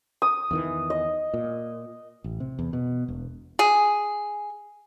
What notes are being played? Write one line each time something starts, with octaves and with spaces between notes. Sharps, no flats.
D#6
E2 D#3 E3
D#5
A#2
A1
C3
E2
B2
E1
G#4